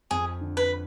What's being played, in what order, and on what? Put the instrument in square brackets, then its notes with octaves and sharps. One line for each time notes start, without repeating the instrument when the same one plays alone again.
[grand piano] F2 [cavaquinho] G#4
[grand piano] D3
[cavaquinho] B4